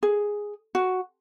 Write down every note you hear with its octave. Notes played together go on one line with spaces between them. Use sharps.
G#4
F#4